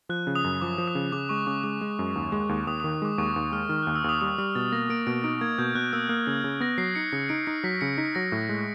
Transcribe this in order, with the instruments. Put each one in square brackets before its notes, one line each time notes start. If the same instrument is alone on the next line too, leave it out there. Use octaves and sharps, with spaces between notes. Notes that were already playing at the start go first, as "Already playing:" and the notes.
[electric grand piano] F3 [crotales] F#6
[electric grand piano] C#3
[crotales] D#6
[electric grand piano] F#2
[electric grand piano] F3 [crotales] D6
[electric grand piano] F3
[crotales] D#6
[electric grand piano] C#3
[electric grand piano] C#3 [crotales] D6
[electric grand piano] G#3 [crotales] C#6
[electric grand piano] C#3 [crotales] D6
[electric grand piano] G#3 [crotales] D6
[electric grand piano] G#3
F#2
D#2
G#3
D#2
[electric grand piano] D#2 [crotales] D#6
[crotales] D#6
[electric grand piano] D#3
[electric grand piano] G#3 [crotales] D6
[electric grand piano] D#2 [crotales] C#6
[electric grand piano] D#2
[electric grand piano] G#3 [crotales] F6
[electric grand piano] D#3 [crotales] F6
[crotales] F#6
[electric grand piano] D#2
[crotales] E6
[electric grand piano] D#2 [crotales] D#6
[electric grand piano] G3 [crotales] D#6
[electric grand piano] G3 [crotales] F6
[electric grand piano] B2 [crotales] A6
[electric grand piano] A#3 [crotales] A#6
[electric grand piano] A#3 [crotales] D7
[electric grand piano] B2 [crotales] D7
[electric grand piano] D#4 [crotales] D7
[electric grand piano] A#3 [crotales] G#6
[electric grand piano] B2 [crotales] G6
[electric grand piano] B2 [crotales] F#6
[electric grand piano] A#3 [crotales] E6
[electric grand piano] A#3 [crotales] F6
[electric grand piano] C#3 [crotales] G#6
[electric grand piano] C#3
[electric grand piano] B3 [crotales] A#6
[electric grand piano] F#3 [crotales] C7
[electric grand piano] D#4 [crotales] C#7
[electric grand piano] C#3 [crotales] C#7
[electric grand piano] D#4 [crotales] D7
[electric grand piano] D#4 [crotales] C7
[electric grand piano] F#3 [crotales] B6
[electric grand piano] C#3 [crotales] C#7
[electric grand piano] D#4 [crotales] B6
[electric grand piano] F#3 [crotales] A#6
[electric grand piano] A2
G#3